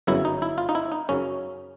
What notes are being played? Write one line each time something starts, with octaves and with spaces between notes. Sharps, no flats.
G1 F#2 C#3 F#3 B3 E4
D#4
E4
F4
D#4
E4
D#4
F#2 C#3 F#3 C#4